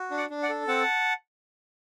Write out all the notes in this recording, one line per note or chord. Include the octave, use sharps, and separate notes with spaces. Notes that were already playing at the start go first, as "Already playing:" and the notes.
Already playing: F#4
D4
D5 F#5
D4
D5 F#5
A4
C4 F#5 A5